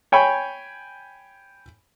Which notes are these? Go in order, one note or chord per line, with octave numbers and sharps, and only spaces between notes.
C#5 G5 G#5 B5